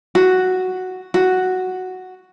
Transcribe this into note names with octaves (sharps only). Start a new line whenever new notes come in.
F#4
F#4